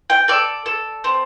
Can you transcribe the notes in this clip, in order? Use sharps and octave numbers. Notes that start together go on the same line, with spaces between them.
G5
A4 D5
A4
C4